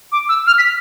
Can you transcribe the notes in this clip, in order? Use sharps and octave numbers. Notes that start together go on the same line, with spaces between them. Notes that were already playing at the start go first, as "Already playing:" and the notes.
D6
E6
F6
B6